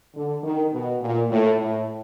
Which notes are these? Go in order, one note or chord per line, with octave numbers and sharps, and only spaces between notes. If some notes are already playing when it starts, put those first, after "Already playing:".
D3
D#3
B2
A#2
A2
A2